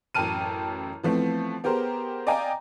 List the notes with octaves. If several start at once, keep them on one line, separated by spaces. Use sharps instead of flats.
A1 F#2 G5 A5 F6 D#7
E3 F3 A3 B3 C4
B3 G4 G#4 A#4 C5
D5 D#5 F5 G5 G#5 A#5